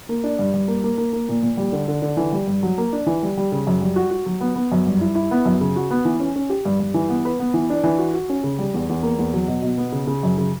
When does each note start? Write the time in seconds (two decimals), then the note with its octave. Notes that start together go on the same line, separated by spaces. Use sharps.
0.09 A#3
0.24 D4
0.39 G2
0.54 G2
0.68 A#3
0.84 A#3
0.98 A#3
1.13 A#3
1.29 A#2
1.43 A#2
1.57 G3
1.72 D3
1.88 D3
2.02 D3
2.17 E3
2.32 G3
2.47 G2
2.63 F#3
2.78 A#3
2.93 D4
3.06 E3
3.23 G3
3.37 G3
3.52 C#3
3.67 F#2
3.81 G3
3.96 F#4
4.11 F#4
4.26 F#3
4.41 B3
4.56 B3
4.72 F#2
4.87 G2
5.01 E4
5.15 E4
5.31 B3
5.45 F#2
5.61 C#3
5.76 F#4
5.91 B3
6.05 E3
6.20 C#4
6.36 C#4
6.50 G4
6.65 G2
6.80 G2
6.94 E3
7.09 B3
7.25 B4
7.39 B3
7.54 E3
7.70 D4
7.84 E3
7.98 F#4
8.13 F#4
8.29 C#4
8.43 C#3
8.59 G3
8.74 E2
8.89 E2
9.03 A#3
9.18 E2
9.34 F#3
9.48 B2
9.63 B2
9.78 B3
9.92 C#3
10.07 C#3
10.23 F#2
10.38 C#3